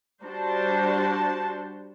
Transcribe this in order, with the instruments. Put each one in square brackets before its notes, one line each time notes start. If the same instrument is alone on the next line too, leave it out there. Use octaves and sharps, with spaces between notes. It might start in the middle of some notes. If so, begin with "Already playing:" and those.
[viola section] G3 D4 F#4 C5 [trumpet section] A5